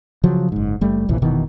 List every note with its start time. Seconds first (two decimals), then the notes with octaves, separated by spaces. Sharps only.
0.23 C#3 F3 F#3
0.52 F#1 G#2
0.81 F#1 G3 A3
1.09 G1 C2 A#2 E3
1.22 F1 B2 D#3 E3